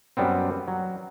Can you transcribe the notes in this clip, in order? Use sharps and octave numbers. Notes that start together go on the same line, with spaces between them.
F#2 G3 B3 C4
F#3